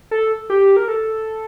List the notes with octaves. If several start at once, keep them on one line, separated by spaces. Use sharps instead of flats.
A4
G4
A#4
A4